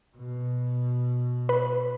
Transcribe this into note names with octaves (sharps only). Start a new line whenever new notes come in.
B2
B4